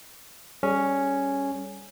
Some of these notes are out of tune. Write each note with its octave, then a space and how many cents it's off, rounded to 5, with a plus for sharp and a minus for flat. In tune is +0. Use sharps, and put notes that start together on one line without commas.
G3 +0 C#4 +0 G#4 +40